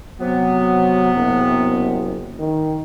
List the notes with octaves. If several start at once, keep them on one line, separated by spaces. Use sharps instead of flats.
C3 F#3 B3
F#1
D#3